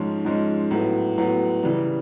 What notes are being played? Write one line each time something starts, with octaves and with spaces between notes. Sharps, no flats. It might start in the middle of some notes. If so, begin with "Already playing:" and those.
Already playing: G#2 F3 G#3 C#4
G#2 F3 G#3 C#4
A2 F#3 B3
A2 F#3 B3
C#3 E3 G3